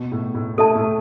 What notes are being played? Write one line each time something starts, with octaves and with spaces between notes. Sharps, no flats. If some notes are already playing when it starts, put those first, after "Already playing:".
Already playing: B2
A2
A2
A2 A4 E5 A5
A2